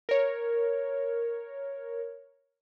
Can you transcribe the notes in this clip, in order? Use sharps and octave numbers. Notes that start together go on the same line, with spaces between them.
A#4 C#5